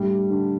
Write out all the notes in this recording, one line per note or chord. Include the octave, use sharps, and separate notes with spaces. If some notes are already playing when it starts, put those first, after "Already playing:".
Already playing: A2 G3 A3 D4
D3